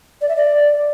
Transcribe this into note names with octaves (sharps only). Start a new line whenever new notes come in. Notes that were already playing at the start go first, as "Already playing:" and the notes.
D5
E5
D5